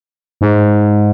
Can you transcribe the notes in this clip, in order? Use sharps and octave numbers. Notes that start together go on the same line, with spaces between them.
G#2